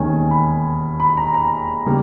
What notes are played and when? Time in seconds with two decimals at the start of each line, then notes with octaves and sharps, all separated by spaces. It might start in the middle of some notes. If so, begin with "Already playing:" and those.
Already playing: E1 D#2 D#3 G#3 C#4 G#5
0.31 B5
1.00 B5
1.17 A#5
1.34 A#5
1.86 C#3 G3 A#3